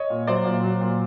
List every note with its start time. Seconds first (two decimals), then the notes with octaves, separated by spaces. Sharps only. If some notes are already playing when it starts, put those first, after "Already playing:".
Already playing: C#5 D#5
0.10 A#2
0.27 F#3 C5 D5
0.45 A#2
0.63 F#3
0.81 A#2